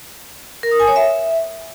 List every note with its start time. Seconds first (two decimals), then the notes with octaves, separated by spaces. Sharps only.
0.63 A#4
0.71 D#6
0.80 G#5
0.88 C#5
0.96 E5